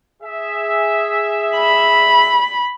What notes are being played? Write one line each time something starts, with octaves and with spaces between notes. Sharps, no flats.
G#4 E5
B5